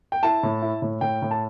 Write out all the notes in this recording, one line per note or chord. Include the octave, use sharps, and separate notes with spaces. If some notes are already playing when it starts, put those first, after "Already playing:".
G5
E4 A5
A2
E4
A2
A2 G5
A2
A5